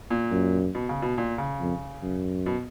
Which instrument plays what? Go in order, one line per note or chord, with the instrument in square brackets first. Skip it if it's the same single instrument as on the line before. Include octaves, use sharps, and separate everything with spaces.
[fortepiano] A#2
[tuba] F#2
[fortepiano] B2
C#3
B2
A#2
C#3
[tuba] F2
F#2
[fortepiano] B2